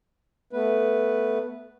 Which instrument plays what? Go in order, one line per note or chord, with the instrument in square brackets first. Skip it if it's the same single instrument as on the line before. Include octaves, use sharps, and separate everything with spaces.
[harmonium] A3 B3 B4